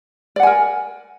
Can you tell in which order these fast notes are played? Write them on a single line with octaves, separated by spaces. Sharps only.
D5 F#5 G#5 A#4